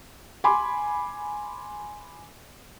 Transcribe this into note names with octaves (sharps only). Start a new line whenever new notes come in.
G#5 B5 C6 D6